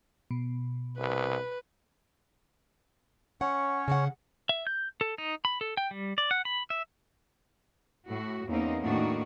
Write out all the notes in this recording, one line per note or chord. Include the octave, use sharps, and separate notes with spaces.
B2
C2 B4
C#4 C#5 F#5
C#3 F#5
E5
G6
A4
D#4
B5
A4
G5
G3
D5
F#5
B5
E5
A2 F#4
E2 A#3 C4 C#4 D#4
A2 D#3 A#3 D4 F#4